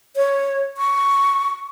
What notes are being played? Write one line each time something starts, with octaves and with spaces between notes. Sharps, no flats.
C#5
C#6